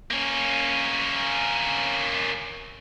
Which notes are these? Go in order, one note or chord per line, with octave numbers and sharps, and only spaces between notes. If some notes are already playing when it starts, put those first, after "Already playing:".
A#3 C#4